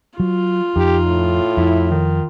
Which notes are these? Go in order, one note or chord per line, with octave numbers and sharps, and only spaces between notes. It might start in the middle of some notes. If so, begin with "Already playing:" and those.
F#3 F4
F2 D#4 G4
A2
F2 E4
D#3